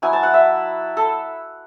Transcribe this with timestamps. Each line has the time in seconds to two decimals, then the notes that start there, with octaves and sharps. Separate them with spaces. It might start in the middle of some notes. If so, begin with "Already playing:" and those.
0.02 F#3 B3 E4 G#5
0.13 A5
0.23 F#5
0.34 E5
0.97 A4